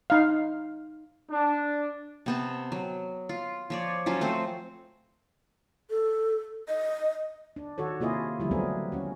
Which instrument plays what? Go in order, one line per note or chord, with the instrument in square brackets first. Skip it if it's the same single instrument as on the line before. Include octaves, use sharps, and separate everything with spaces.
[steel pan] D#4 F5
[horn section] D4
[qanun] C3 B3 A5
F#3
F4
F3 C#5 D5
F3 F#3 C#4 F4
A3 C4 C5
[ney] A4
D#5
[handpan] D4
D#3 F#4 A4 C#5
C3 A#3 E4 F4 G#4 D#5
D3 F3 G3 E4
F#3 A3 B3 C4 G#4 A#4
C#4 F#4